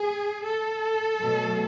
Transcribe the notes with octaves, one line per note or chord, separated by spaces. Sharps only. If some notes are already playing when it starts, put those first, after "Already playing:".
Already playing: G#4
A4
B2 F#3 A3